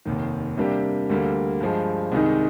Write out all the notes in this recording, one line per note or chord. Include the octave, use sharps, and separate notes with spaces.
F1 D#2 D#3
C3 G3 A#3 D4 G4
D2 D3 G3 A#3
G2 F3 G#3
C2 C3 D#3 G#3 D#4